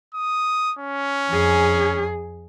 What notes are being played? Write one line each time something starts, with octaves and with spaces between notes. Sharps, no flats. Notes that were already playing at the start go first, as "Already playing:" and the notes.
D#6
C#4
F2 G#4